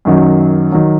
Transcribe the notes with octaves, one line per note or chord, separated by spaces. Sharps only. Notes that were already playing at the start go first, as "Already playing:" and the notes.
F#2 D#3 F#3
D#3 F#3